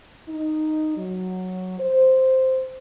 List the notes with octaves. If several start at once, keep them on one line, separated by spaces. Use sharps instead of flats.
D#4
F#3
C5